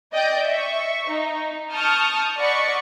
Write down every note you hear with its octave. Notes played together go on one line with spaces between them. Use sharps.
D5 D#5 G5 G6
E5 C#6
D#4
A5 C#6 D#6 F6 G6
D5 D#5 F#5 B5 C#6